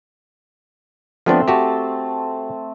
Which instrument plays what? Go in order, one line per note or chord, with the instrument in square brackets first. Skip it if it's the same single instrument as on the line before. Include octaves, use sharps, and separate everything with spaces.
[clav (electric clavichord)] F3 B3 D4 [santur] A3 C4 C5
[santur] A3 C4 A5 [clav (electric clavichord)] F#4 G4